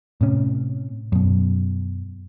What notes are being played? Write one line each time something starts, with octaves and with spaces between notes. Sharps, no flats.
A2 C3 C#4
F#2 B2